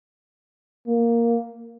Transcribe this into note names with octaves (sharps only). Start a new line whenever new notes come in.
A#3